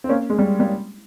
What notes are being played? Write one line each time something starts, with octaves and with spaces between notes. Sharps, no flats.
C4
A#3 C#4
G#3
G3
G3 A#3